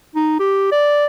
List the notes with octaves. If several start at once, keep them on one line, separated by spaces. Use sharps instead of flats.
D#4
G4
D5